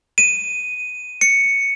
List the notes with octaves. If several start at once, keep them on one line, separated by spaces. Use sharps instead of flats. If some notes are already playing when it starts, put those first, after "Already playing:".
D#7
C#7